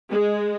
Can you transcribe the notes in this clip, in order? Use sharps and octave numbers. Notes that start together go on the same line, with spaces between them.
G#3